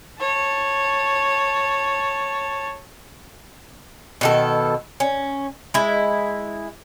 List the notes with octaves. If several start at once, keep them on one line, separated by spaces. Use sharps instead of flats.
C#5 A5
B2 D#3 A4
C#4
G#3 E4